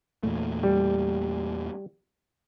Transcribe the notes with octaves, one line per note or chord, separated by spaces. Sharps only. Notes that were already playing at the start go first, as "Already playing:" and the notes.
E2 A#2 A3
G3